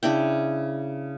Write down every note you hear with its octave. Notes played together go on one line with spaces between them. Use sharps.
C#3 D4 E4 G5